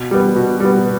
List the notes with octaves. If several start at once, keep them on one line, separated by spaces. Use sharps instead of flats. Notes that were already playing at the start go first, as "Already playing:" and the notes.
Already playing: B2
G3 B3
B2
G3 B3